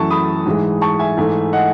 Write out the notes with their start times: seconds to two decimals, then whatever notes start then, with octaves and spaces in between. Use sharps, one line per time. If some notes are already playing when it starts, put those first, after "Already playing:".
Already playing: F#2 E3 A3 A5 C#6
0.11 B5 D#6
0.46 G#2 E3 G#3
0.81 A5 C#6
0.99 E5 G#5
1.17 G#2 E3 A3
1.53 D#5 F#5